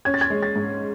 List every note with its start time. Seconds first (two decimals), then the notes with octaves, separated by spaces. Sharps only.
0.05 C#4 G#6
0.14 A6
0.21 G#6
0.30 G#3
0.43 A6
0.56 G#2